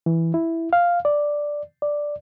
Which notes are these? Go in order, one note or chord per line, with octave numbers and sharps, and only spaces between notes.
E3
E4
F5
D5
D5